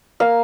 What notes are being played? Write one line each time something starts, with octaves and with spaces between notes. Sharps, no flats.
A#3 F5